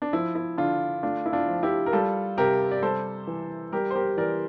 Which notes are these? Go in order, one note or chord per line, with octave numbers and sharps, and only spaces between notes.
D4
F3 E4
E4
D3 D4 F4
A3 D4 F4
E4
D4 F4
F3
E4 G4
A#4
G3 F4 A4
C3 G4 A#4
D5
G3 A4 C5
E3
G3 G4 A#4
C5
G4 A#4
E3 A#4 D5